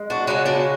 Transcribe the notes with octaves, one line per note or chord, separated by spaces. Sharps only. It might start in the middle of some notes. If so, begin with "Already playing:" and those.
Already playing: G#3
D4 F#4
C#3 E3 G#3 D4 F#4
D4 F#4